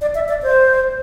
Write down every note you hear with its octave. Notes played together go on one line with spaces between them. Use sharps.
D5
E5
D5
C5